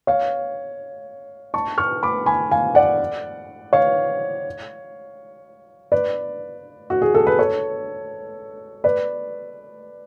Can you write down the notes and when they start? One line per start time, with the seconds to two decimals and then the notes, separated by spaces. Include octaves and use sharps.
0.07 C#5 F5
1.54 A5 C#6
1.78 C#6 F6
2.03 B5 D6
2.26 G#5 B5
2.51 F5 G#5
2.75 D5 F#5
3.73 C#5 F5
5.92 B4 D5
6.90 F#4
7.02 G#4
7.15 A4
7.27 B4
7.39 A4 C#5
8.84 B4 D5